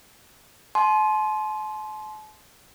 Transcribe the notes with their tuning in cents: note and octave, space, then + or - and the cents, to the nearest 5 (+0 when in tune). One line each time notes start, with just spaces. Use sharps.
A5 -45 C6 +0